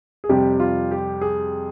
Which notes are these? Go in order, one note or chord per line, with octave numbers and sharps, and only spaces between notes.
G#4
F2 C3 G3 G4
F4
G4
G#4